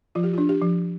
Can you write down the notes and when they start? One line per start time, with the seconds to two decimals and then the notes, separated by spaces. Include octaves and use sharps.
0.15 F3 F4
0.24 G4
0.34 F4
0.38 D4
0.49 G4
0.62 F3